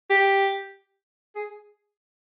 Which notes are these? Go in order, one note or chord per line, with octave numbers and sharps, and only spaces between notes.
G4
G#4